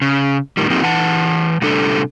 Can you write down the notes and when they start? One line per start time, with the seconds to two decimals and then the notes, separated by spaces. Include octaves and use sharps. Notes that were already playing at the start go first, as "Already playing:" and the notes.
0.02 C#3
0.57 A2 D#3 G3
0.70 F3 A#3 C4 D#4 G4
0.83 E3 F#5 A5
1.62 C3 G3 A3 D4 A4